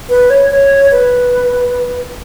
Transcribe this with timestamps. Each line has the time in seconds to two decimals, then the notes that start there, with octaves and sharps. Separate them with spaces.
0.09 B4
0.30 C#5
0.50 C#5
0.91 B4